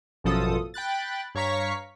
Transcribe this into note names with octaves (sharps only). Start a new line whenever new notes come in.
A1 F#2 B2 F3 A4 D#6
G5 B5 F#6 A6
G2 C#5 F5 A#5 C#6 B6